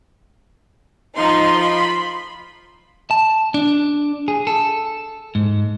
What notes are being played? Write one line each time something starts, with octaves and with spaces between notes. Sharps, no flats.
F3 D#4 C6
B5
A5
D4
G#4
A4
G#2